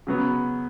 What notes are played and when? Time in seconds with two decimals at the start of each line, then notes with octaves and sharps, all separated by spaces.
0.07 C#3 F#3 B3